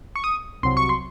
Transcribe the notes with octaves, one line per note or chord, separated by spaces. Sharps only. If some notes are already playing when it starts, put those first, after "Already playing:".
C#6
D#6
C2 C3 F#3 C6
C#6
C6